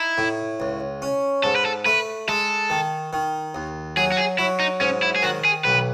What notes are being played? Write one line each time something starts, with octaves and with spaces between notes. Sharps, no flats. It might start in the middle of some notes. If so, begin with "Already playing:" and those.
Already playing: D#4 E4
A2
C#2
C#4
G#2 A4
B4
A4
A3 B4
G#3 A4
D#3
D#3
D#2
F#3 G#4
F#4
G#4
F#3 E4
D#4
G#2 C#4
E4
G#4
D#3 F#4
G#4
B1 B4